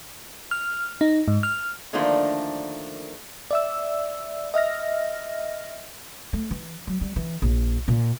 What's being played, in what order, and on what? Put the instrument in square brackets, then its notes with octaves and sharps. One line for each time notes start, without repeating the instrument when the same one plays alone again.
[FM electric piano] F6
D#4
G#2
F6
[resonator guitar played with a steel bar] D3 D#3 F3 A3 A#3 D4
[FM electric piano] D5 E5 E6
D#5 E5 F6 A#6
[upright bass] A3
E3
F#3
G3
E3
A#1
A#2